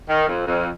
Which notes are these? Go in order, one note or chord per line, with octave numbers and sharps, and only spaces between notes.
D#3
F2
F2